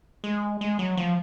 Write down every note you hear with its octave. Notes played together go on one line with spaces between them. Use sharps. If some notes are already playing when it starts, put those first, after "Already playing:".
G#3
G#3
F#3
F3